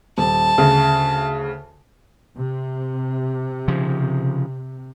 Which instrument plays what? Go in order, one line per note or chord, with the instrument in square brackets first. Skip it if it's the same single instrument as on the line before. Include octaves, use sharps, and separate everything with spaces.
[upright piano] D#1 [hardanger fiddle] A5
[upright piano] D2 C#3
[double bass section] C3
[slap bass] C#3 F3